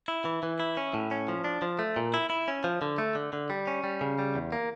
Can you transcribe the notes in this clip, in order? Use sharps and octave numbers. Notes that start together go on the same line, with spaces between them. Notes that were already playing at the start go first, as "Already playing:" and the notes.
E4
E3
E3
E4
C#4
A2
C#4
F3
D4
F3
A3
A#2
E4
E4
C#4
F3
D3
A3
D3
D3
G3
C#4
G3
C#3
G3
E2
A#3